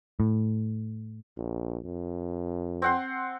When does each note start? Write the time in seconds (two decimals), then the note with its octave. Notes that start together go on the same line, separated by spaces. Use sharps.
0.20 A2
1.37 A#1
1.86 F2
2.82 C4 F#5 C6